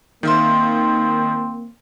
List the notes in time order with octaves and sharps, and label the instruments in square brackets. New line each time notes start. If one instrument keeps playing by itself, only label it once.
[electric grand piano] D#3 [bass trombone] A#3 [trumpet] C4 [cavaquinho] C5 E5 F5